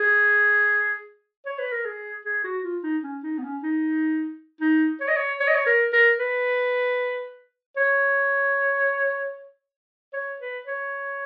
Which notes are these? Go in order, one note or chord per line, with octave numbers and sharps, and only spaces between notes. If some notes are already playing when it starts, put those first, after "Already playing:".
Already playing: G#4
C#5
B4
A#4
G#4
G#4
F#4
F4
D#4
C#4
D#4
B3
C#4
D#4
D#4
C#5
D#5
C#5
C#5
D#5
C#5
A#4
A#4
B4
C#5
C#5
B4
C#5